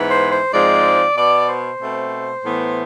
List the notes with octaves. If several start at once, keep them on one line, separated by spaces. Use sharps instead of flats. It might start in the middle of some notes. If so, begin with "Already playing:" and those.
Already playing: G#2 E3 B3
C5
C5
G#2 F3 G#3 C4 D5
B2 B3 D5
C5
B2 A3 C4
A2 E3 B3